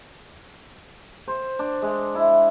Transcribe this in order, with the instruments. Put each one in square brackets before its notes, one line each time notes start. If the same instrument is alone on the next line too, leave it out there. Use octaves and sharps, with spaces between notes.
[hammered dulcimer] C5
D4
G#3
E4